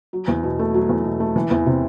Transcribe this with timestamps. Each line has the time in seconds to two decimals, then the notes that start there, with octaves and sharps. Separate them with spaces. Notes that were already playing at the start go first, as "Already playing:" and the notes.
0.13 F#3
0.28 E2
0.43 B2
0.59 A3
0.74 F#3
0.89 E2
1.05 B2
1.20 A3
1.36 E3
1.51 E2
1.66 C3